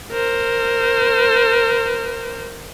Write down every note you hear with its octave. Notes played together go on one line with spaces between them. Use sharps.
A#4 C5